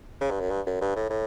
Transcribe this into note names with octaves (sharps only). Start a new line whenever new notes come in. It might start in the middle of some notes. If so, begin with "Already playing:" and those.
C#3
G2
F#2
G2
F#2
G2
A2
A2